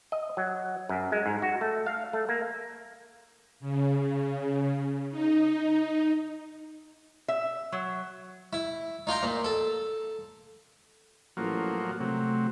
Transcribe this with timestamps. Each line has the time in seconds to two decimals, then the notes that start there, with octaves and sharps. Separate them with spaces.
0.12 D#5
0.37 F#3
0.89 F#2
1.12 G#3
1.26 G#2
1.42 F#4
1.61 A3
1.86 F5
2.13 A3
2.29 A#3
3.60 C#3
5.11 D#4
7.28 E5
7.72 F#3
8.53 E4
9.07 D#4 F4 G5 A#5
9.23 A#2
9.44 A4
11.37 A1 F3 F#3 A#3
12.00 C3 F#3 A3